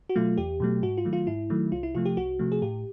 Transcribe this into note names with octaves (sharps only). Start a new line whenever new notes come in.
F#4
B2 F#3 A3 F4
E2 G4
B2 F#3 A3
G#2 F#4
F4
D#3 F#3 A3
F4
G#2 E4
D#3 F#3 A3
C2 F4
E4
C3 F3 A3 F4
G4
C2 F#4
C3 F3 A3
G#4
A2 G4